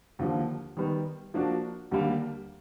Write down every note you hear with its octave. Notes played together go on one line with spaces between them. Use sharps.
D#2 D3 F3 A#3
D#3 G3 B3
F3 A#3 D4 F#4
D#2 D3 G3 A#3